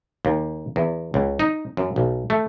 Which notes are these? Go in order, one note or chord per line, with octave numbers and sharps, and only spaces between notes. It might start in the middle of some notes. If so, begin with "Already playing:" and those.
D#2
E2
C#2
D#4
F#2
B1
A3